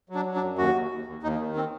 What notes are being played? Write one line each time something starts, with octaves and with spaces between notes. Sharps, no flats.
F#3
D4
F#3
D4
F#2
D#2 F#4
D#2
D#2
D#2
D#2 D#4
D#3
C4